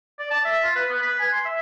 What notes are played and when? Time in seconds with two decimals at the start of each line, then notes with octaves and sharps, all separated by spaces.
0.19 D5
0.31 A5
0.45 E5
0.63 F4
0.75 B4
0.89 B3
1.02 B4
1.19 G#5
1.32 C6
1.45 E5